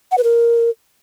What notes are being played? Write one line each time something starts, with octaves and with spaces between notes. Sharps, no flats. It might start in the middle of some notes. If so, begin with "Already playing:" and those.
F#5
B4
A#4